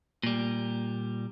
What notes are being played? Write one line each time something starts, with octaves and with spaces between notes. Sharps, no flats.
A#2 G3